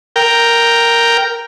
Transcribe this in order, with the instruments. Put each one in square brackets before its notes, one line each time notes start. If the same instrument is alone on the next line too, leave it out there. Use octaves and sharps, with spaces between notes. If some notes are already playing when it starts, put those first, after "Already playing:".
[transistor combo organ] A#4 G5